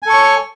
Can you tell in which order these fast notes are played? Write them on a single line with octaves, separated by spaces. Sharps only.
G#5 A4 C#6 C#5